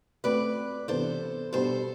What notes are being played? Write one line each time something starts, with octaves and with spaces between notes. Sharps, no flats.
A3 C4 F#4 B4 D5
C3 E3 B3 D4 A4 C5
B2 G3 B3 D4 A4 C5